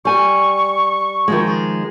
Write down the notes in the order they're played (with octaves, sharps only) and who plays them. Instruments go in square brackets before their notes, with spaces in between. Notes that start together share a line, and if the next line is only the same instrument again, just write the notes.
[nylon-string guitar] G3 G#5 [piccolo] C#6
[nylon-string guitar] D#3 F3 G#3